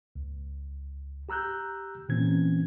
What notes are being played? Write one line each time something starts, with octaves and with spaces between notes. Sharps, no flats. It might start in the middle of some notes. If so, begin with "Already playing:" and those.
C#2
G4 A#5 E6 F#6 G6
A#2 E3 C4 C#4 G#6